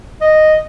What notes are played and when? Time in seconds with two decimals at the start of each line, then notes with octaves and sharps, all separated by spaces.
0.21 D#5